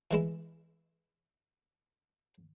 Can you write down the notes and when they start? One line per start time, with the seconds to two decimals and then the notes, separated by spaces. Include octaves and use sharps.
0.11 E3 G#3 E4